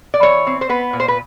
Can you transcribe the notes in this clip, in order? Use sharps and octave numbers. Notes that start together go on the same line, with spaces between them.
D5
E3 C#5
C4
C5
B3 B4
A#2
C5
B4